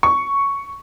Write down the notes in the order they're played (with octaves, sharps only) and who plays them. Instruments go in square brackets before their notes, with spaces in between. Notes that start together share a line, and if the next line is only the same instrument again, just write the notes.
[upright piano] C#6